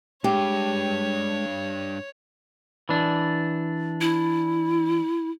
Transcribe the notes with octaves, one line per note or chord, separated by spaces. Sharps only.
G2 G#3 G4 C#5
E3 D4
E4